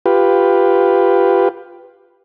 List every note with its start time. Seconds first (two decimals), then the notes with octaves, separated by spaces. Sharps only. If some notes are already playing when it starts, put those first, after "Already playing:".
0.06 F4 G4 B4